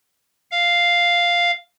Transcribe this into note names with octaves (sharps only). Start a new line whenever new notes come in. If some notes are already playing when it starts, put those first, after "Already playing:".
F5